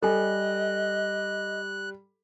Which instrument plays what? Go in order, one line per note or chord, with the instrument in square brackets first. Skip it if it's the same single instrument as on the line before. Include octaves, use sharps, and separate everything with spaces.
[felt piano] G3 [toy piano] A4 G#5 [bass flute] D#5 [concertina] F#6